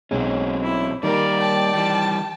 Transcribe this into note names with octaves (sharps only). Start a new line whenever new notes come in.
B1 F#3 G#3 C4 C#4
E4
D#3 G3 A#3 G4 A#4 D5
G5 A5
E3 G3